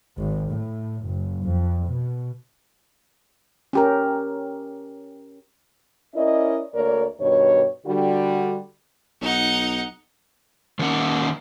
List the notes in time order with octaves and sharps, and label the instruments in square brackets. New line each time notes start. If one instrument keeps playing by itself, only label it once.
[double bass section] G#1
A2
F#1
F2
B2
[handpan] C#4 G4 A#4
[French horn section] C#4 E4 A#4 D5 D#5
D2 A#3 A#4 C#5 D5
G2 B2 D#3 C#5
D3 G3 F#4
[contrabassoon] B1 [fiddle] D#4 F#5
[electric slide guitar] D#3 A#3 C#4 F#5